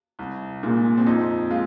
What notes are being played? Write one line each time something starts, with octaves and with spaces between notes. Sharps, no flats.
C2
A#2 G#3
C4
F2 D#4
G#3 F4